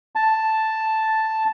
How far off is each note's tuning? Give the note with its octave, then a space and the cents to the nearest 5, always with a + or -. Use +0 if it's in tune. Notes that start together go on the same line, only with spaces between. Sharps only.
A5 +0